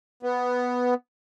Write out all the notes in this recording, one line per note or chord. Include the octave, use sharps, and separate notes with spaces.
B3